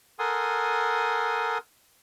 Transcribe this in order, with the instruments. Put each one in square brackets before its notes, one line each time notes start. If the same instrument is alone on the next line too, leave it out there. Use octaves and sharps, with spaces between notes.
[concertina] A4 A#4 F#5 G#5 C6 D#6